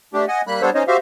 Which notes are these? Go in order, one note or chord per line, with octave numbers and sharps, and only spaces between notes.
A3 D4 G4
D#5 F#5 G#5
G3 A#3 B5 F#6
G3 B3 D4 A4 C5 C#5
C#4 D#4 C5 C#5 D#5
F#4 G4 C5 E5 F5